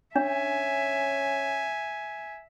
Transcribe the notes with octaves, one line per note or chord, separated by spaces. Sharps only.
C#4 D4 E5 G#5